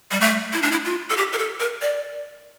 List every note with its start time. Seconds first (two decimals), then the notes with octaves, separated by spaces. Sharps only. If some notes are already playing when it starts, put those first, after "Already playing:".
0.11 G3
0.21 A3
0.53 E4
0.62 D4
0.72 E4
0.85 F4
1.10 A4
1.17 G4
1.33 A#4
1.38 A4
1.60 A#4
1.82 D5